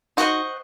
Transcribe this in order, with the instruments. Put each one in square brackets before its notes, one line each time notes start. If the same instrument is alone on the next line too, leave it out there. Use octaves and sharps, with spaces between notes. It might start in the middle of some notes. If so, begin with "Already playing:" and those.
[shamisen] D#4 F#4 [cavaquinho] C5 D#5 F#5 C#6